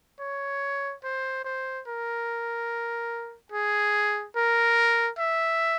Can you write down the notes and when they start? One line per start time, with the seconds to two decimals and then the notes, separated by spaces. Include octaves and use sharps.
0.20 C#5
1.04 C5
1.44 C5
1.87 A#4
3.52 G#4
4.36 A#4
5.18 E5